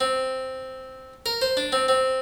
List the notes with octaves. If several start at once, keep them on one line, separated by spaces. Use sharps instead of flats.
C4
A#4
C5
D4
C4
C4